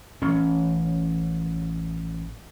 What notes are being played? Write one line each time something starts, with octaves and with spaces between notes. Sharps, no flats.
A1 C#4